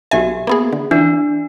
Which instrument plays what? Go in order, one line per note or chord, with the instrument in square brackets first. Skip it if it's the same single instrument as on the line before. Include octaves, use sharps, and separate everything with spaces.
[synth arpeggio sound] B1 G#5 [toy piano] F#4 G4 E5
[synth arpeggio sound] A#3 B3 G#4
D3
[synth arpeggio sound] E3 [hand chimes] D4